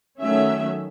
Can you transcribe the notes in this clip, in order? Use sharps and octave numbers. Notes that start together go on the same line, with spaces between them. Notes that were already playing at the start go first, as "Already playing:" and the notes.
D#3 F#3 A3 C#4 E5